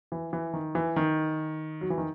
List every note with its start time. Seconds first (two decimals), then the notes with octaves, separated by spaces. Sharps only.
0.12 E3
0.33 E3
0.53 D#3
0.75 E3
0.96 D#3
1.81 F#3
1.90 E3
1.98 D#3